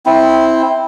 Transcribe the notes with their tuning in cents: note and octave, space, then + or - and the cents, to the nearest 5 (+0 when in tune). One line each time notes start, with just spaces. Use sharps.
C4 +0 E4 -15